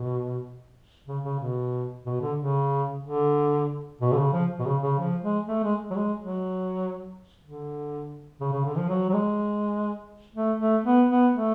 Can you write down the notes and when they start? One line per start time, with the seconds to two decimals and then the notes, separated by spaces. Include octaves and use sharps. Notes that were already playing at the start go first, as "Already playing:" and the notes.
Already playing: B2
1.07 C#3
1.24 C#3
1.40 B2
2.06 B2
2.21 D3
2.38 C#3
3.03 D3
4.01 B2
4.13 D3
4.18 C#3
4.33 F3
4.59 B2
4.65 C#3
4.82 C#3
4.99 F3
5.22 G#3
5.48 A3
5.63 G#3
5.90 F#3
5.96 G#3
6.20 F#3
7.43 D3
8.40 C#3
8.53 C#3
8.65 D3
8.77 F3
8.89 F#3
9.09 F#3
9.14 G#3
10.35 A3
10.60 A3
10.84 B3
11.09 B3
11.33 A3